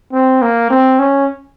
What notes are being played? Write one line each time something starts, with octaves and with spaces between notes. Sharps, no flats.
C4
A#3
C4
C#4